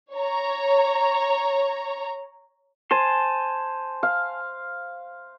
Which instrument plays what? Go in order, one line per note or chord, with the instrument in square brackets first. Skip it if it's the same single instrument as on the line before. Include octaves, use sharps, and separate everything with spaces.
[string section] C#5 A#5
[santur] C5 [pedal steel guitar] G#5 A5 C6
[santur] F5